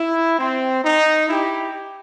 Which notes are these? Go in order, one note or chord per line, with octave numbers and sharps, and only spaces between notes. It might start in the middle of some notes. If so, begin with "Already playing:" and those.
Already playing: E4
C4
D#4
E4 G4